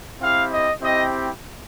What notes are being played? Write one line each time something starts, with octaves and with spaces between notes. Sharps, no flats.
C4 E4 G4 F5
D#5
C4 E4 G4 D#5